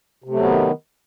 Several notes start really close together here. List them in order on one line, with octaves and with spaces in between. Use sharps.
C3 A3 F#3 B3 D#3